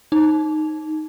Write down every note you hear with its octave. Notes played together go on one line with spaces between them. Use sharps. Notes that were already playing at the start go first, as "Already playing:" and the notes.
D#4